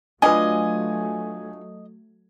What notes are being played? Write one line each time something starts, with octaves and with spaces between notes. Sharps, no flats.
F#3 A3 D4 F4 B4 D#5 G#5